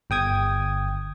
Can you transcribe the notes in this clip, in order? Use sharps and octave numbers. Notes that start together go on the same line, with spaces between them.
G1 G5 D#6 G#6